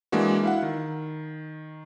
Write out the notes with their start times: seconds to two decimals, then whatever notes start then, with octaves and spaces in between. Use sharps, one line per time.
0.12 E3 G#3 A#3 D4 F#4
0.43 E4 F5 F#5
0.63 D#3